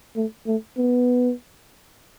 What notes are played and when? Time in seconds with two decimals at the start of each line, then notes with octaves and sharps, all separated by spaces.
0.16 A3
0.46 A3
0.77 B3